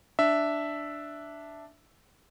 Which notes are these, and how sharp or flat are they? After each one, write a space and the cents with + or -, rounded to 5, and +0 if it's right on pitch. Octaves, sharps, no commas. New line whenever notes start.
D4 +0 E5 +0